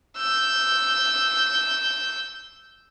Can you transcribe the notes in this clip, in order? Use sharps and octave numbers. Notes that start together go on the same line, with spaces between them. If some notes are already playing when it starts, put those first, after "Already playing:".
E6 G6